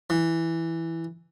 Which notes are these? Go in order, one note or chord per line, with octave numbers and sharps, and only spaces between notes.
E3